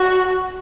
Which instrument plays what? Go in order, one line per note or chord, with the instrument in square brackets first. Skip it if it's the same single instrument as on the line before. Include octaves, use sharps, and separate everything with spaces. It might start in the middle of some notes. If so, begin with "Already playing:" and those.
Already playing: [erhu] F#4